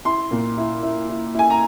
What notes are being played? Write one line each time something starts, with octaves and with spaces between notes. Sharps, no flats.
E4 C6
A#2
E4
E4
E4
E4 G#5
A#5